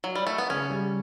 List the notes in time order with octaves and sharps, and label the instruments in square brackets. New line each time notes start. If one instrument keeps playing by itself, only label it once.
[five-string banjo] F#3
G3
A3
B3
[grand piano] C#3 [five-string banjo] C#4
[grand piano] G3